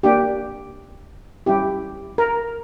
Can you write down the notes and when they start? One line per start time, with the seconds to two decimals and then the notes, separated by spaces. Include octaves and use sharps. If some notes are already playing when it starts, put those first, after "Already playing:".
0.03 A#3 D4 G4
1.46 G3 C#4 E4 G4
2.18 A#4